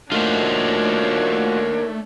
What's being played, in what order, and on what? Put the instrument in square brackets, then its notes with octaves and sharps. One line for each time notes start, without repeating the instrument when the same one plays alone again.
[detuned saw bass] A3 [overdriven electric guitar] A#3 D#4 [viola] D4 C#5 [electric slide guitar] F4 F#4 C5